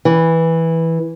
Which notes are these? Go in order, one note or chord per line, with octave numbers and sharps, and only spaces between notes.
E3